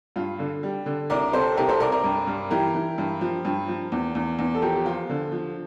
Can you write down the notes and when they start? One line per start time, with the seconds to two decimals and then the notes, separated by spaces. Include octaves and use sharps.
0.16 G2 F4
0.39 D3
0.63 G3
0.86 D3
1.10 C2 A#4 D5
1.33 C3 A4 C5
1.57 C2 G4 A#4
1.69 A4 C5
1.80 C2 A#4 D5
1.92 A#4 D5
2.04 G2
2.27 G2
2.50 E3 G4 A#4
2.74 E3
2.98 G2
3.21 F3
3.45 G2
3.68 F3
3.92 E2
4.15 E2
4.39 E2
4.55 A4
4.62 F3 G4 A#4
4.74 G4
4.85 F3 F4
5.09 D3
5.32 F3